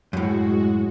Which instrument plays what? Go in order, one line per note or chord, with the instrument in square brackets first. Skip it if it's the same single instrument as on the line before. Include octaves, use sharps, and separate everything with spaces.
[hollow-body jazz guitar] F#2 A2 [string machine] G#3 F#4